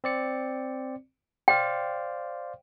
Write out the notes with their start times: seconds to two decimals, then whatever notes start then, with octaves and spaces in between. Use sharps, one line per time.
0.04 C4 D5 C#7
1.48 C5 D5 F5 G5